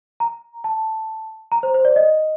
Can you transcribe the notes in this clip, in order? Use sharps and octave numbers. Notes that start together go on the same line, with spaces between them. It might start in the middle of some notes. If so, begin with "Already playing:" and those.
A#5
A5
A#5
C5
C5
D5
D#5